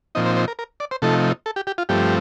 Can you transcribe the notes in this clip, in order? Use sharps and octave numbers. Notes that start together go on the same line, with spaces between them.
A#2 F3 C4 D#4 D#5
C5
C5
A#4
A#4
D5
C5
C3 F3 A3 D#4 A4
A4
G4
G4
F4
G2 F3 A3 C4 G4